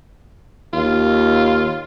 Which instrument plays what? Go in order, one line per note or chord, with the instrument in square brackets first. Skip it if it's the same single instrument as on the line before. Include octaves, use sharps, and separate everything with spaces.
[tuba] D#2 [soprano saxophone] F4